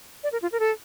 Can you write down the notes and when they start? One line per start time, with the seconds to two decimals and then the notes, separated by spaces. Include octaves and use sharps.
0.24 D5
0.32 A#4
0.42 F4
0.52 A#4
0.60 A4